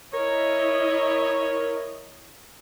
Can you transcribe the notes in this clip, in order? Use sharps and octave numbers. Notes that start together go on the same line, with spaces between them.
E4 A#4 C#5 D#5